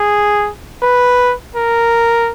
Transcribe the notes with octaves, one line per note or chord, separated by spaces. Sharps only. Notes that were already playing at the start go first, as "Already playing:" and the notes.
Already playing: G#4
B4
A#4